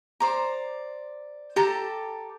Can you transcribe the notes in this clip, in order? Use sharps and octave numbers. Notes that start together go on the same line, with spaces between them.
C5 D5 A#5
G4 A4 A5 A#5